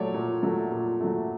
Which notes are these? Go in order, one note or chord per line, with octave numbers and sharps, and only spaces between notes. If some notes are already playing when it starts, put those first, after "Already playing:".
Already playing: A#2 F#3 A3 C#5 D5
A#2
F#3 A3
A#2
F#3 A3